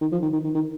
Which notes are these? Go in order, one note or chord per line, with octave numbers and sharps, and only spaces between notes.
D#3
F3
D#3
D#3
D#3
D#3